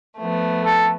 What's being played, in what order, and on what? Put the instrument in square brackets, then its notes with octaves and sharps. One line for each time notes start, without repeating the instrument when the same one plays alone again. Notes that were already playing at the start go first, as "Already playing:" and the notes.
[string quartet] F3 A3 B3
[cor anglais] A4